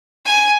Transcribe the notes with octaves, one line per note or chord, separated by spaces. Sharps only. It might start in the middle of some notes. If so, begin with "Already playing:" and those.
G#5